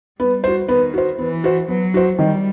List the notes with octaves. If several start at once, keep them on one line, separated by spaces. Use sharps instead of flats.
G3 B3
F#4 C5
D#3 B3
F#4 C5
E3 B3
F#4 C5
F#3 B3
F#4 C5
D#3 G3